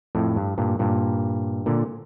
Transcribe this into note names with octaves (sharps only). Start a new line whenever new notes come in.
F2 A2
G2
G2 A#2
G2 A#2
A#2 D3